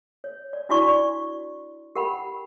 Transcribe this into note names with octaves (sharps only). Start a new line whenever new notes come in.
C#5
D5
D4 E4 F#4 D5 C#6
G4 A#4 F#5 G5 B5